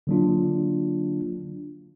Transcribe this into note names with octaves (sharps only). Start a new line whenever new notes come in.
D3 F#3 A#3 D4 F4